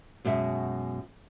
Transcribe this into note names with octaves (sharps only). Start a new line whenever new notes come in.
F#2 B2 G#3 E5